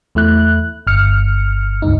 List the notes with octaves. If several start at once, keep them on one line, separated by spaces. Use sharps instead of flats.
E2 A3 E4 F#6
G1 F6 C#7
C#2 G2 D#4